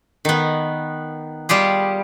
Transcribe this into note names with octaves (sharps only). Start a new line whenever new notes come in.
D#3 B3
G3 F4 G4 G#4